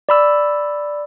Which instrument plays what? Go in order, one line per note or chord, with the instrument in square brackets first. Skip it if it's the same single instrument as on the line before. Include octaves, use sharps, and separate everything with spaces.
[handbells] D5 B5 E6